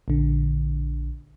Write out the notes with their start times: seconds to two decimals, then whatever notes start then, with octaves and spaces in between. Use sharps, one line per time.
0.08 A#1 D3